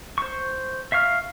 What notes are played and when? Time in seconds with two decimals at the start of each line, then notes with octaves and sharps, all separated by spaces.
0.18 C5 C#6
0.92 E5 F5 C#6 F6